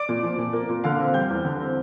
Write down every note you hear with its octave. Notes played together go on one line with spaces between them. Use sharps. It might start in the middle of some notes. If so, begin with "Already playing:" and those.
Already playing: D5 D6
A#2
F3
A#2
A#3
A#2
D3 F5 F6
C4
G3 G5 G6
E2
D3
C4